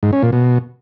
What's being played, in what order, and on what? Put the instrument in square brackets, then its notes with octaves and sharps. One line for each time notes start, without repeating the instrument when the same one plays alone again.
[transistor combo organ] G#2
C#4
A#2
B2